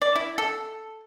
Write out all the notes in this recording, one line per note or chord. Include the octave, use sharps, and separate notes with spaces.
D5
E4
A4